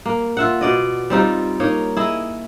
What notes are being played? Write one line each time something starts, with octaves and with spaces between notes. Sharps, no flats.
A#3
F4 E5 F#5
B2 D5 D#5
G3 C4 D#4 F4
A#3 D#4 C#5
E4 G#4 D#5